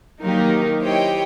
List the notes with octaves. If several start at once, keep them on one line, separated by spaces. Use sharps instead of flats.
D#3 F#3 A#3 D#4 G4 A#4
E4 G4 C5 C#5 D#5 G5